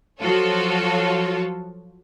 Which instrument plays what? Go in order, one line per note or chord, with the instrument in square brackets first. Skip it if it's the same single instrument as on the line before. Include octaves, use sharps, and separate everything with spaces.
[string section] F3 F#3 F4 F#4 A4 C#5